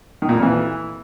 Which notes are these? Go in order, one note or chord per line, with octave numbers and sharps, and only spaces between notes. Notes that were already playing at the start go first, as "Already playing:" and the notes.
D#3
A#2
F2
E3